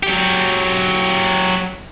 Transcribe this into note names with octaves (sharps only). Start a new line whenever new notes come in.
F#3 G4